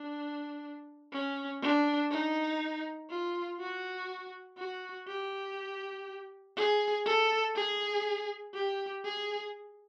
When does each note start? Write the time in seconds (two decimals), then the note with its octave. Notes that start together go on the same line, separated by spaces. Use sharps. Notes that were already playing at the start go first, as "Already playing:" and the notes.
Already playing: D4
1.12 C#4
1.62 D4
2.11 D#4
3.10 F4
3.60 F#4
4.58 F#4
5.08 G4
6.57 G#4
7.06 A4
7.56 G#4
8.54 G4
9.04 G#4